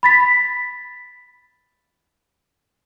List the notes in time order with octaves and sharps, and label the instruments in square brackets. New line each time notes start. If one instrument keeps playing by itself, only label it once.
[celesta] B5 A6 B6